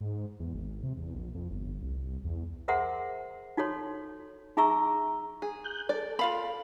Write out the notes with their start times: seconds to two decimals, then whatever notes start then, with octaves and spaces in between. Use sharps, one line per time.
0.01 G#2
0.40 E2
0.54 G#1
0.83 C3
0.97 E2
1.15 A#1
1.35 F2
1.51 G1
1.82 C2
2.24 E2
2.68 G#4 A#4 C5 E5 F#5 C6
3.57 D#4 F#4 A4 C#5 C6
4.57 D#4 G#4 E5 A#5 C#6 E6
5.42 G#4
5.64 F#6 G6
5.89 A4 D5
6.19 F4 F5 B5